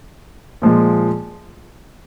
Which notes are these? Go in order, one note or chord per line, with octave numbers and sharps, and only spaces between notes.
A#2 F3 G#3